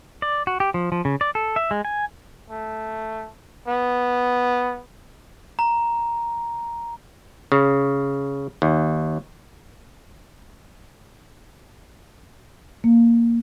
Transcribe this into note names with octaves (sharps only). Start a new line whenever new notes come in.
D5
F#4
G4
F3
F3
C#3
D5
A4
E5
G#3
G#5
A3
B3
A#5
C#3
D#2
A#3